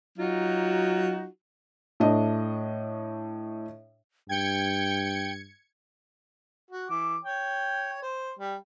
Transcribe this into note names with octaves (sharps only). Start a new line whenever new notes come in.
F#3 D#4 F4 F#4
A2 A3 D4 D#5
G2 G5 G#6 C#7
F#4
E3 D6
C#5 G5
C5
G3